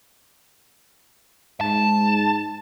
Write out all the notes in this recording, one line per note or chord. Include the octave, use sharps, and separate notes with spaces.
G#2 A5